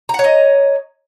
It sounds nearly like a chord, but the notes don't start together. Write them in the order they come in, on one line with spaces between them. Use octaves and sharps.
A#5 F#5 C#5 D#5